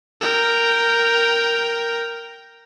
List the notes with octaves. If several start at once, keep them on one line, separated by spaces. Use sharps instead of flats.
A#4 G5